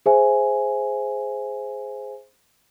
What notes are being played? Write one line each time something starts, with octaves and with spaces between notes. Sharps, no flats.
G#4 C5 E5 G#5